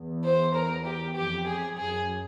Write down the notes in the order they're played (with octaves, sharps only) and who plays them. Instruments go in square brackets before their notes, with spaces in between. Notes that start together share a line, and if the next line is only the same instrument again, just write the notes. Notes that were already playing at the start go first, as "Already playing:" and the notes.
Already playing: [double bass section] E2
[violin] C5
A#4
G4
[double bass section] F2 [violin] G4
[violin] G#4
[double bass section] F#2 [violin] G#4